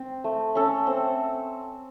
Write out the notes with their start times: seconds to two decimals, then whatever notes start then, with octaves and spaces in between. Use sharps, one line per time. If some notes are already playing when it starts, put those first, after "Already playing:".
Already playing: C4 C5
0.24 A3
0.55 C#4 A4
0.87 C4